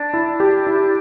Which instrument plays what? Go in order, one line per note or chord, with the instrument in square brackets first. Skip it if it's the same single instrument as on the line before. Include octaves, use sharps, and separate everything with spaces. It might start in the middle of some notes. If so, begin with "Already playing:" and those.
Already playing: [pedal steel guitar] D4
[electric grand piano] E4
G4
E4